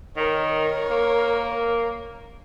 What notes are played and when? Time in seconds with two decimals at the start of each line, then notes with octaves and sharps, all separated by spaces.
0.17 D#3 A#4 C#5
0.91 A#3